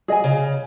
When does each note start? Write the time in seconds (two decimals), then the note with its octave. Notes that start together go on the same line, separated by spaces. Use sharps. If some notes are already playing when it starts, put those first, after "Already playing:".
0.08 G#4 D#5 G#5
0.24 C#3